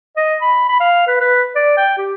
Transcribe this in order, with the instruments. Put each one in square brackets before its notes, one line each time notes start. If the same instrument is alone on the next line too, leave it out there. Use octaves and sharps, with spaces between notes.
[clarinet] D#5
B5
B5
F5
B4
B4
D5
G5
G4